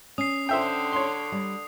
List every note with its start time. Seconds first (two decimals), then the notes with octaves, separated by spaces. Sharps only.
0.18 C#4 D#6 C7
0.49 D3 C5 E5 G5
0.93 C#5 C6
1.32 G3